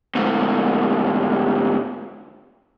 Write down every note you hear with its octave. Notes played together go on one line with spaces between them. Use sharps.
D2 G#2